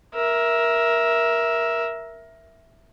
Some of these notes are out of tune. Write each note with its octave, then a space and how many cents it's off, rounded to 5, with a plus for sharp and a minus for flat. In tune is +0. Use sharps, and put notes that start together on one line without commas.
A#4 +15 E5 +0